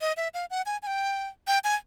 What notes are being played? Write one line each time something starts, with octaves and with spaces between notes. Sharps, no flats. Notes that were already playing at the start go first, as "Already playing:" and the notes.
D#5
E5
F5
F#5
G#5
G#5
G5
G5
G#5